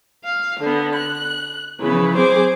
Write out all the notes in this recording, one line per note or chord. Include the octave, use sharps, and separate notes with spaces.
F5
D3 B3
F#6
C#3 E3 F3 B3 B4
F#3 C4 G#4 C5 D6